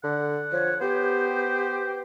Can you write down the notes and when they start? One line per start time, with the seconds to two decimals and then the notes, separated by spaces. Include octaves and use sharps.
0.04 D3 F#5
0.52 F3 C#5
0.81 B3 G4 C5